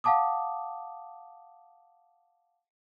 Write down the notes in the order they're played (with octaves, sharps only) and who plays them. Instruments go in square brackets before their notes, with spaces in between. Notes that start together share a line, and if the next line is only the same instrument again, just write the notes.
[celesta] F5 F#5 A5 D6 D#6